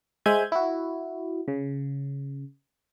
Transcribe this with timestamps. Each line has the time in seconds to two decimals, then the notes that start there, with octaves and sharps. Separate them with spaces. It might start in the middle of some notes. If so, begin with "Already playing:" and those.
0.26 G#3 C5 E5 G#5 G6 G#6
0.52 E4 F#4
1.48 C#3